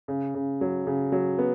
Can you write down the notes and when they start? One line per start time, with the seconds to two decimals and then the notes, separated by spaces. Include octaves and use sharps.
0.08 C#3
0.34 C#3
0.61 F#3
0.87 C#3
1.12 F#3
1.39 B3